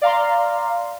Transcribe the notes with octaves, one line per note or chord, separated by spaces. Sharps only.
D5 F5 A#5 C6